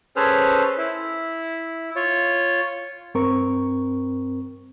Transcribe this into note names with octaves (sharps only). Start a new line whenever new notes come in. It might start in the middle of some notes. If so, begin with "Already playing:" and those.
C#4 G#4 A4 B4 C5 F6
E4
F4 C#5
G2 C4 A#4 C#6